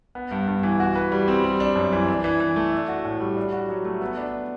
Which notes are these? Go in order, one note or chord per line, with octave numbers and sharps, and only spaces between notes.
B3
G2
G2
E3
F#4
B4
G3
C4
G3
D4
F#2
E3
D4
E3
E3
A3
D4
F#4
A2
G3
D4
F#4
F#3
A3
B3
D4